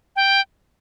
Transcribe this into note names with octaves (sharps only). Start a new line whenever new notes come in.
G5